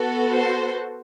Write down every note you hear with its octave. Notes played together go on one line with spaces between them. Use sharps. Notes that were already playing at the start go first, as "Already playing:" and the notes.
Already playing: B3 F#4 A4
C5